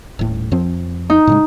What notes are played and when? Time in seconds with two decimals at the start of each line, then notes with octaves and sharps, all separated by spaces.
0.19 D#1 A2
0.51 F2 F3 C4
1.10 D#4
1.27 A2 C#3 G#3